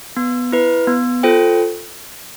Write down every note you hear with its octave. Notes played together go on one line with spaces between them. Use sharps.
B3
E4 B4
B3
F4 A4 C5 G5